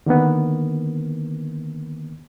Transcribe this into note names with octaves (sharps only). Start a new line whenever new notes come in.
D3 D#3 A#3 B3